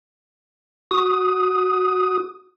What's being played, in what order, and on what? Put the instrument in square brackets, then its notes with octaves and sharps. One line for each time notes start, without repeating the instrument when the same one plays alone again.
[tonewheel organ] F#4 D#6